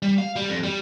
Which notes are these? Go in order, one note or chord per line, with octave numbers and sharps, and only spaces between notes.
G3
F5
G3
F2
G3